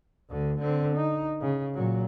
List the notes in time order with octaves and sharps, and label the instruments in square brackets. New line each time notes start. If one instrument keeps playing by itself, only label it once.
[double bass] D2 D3
D3 C4
D#4
C#3
A#2 F#3